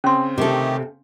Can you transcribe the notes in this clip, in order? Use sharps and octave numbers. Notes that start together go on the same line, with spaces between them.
C#3 C4 C#4 C6
C3 D#3 A3 G4 A4